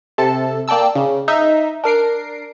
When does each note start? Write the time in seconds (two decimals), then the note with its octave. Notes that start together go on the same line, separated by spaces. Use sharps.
0.18 C3 A4 A5
0.68 A#3 D5 G5 A5 E6
0.95 C#3
1.28 D#4 E5
1.84 D4 A#4 C7 D7